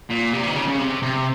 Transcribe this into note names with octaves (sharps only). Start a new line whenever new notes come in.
A#2
C3
D#3
C#3
C#3
C3
C3